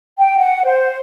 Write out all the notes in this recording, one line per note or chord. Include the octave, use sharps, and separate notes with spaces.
G5
F#5
C5